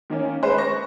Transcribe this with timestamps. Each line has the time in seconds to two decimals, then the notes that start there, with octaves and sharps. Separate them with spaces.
0.10 D#3 A#3 C#4
0.42 G#3 B4 C5
0.58 C#6 A#6